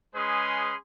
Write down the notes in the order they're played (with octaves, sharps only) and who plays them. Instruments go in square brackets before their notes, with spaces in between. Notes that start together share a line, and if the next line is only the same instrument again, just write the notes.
[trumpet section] G#3 C#4 G#4 B4 C6 D#6